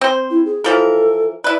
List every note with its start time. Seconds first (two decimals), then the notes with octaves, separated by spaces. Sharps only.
0.01 C4 C5
0.31 E4
0.46 G#4
0.64 E3 F3 A4 A#4
1.44 E4 B4 D5